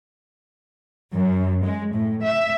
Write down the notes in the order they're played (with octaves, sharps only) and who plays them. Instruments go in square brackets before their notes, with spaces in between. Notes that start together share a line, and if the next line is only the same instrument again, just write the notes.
[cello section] F#2
G#3
A2
E5